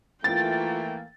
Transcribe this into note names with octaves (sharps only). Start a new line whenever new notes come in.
E3 A3 A#3 F4 G5 A6